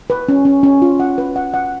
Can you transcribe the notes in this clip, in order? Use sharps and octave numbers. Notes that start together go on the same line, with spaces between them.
B4
C#4
C#4
C#4
F4
F#5
B4
F#5
F#5